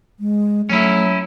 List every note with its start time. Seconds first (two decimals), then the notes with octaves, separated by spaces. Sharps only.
0.20 G#3
0.70 F#3 A3 C#4 E4